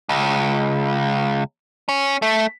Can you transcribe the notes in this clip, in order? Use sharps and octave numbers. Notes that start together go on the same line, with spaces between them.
C#2
C#4
A3